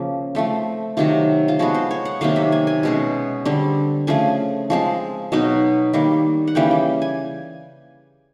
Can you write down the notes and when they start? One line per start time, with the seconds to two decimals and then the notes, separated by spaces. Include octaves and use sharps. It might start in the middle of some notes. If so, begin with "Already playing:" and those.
Already playing: C#3 F3 A#3
0.35 F3 A3 C4
0.97 C3 D#3 F#3 F4
1.48 F4
1.59 F3 G#3 B3 F#4
1.75 C5
1.91 C#5
2.05 F#5
2.21 C3 D#3 F#3 A#3 F5
2.36 E5
2.52 G#5
2.67 G#5
2.83 B2 G#3 C#4
3.45 D3 G3 C4
4.07 C#3 F3 A3 G#5
4.70 F3 G#3 C4
5.32 B2 F#3 B3 D#4
5.93 D#3 G3 A#3
6.47 F#5
6.55 C#3 E3 G3 A#3 G5
6.71 G5
7.02 G#5